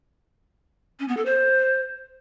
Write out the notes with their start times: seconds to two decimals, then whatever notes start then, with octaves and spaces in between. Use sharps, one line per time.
0.99 C#4
1.08 B3
1.17 A4
1.25 C5